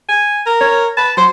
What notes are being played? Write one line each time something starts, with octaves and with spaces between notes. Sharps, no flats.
G#5
A#4
C#5
B4 A5
F#3 C5